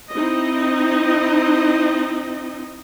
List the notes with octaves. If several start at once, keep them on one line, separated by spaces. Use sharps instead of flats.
C4 D#4 E4 D#5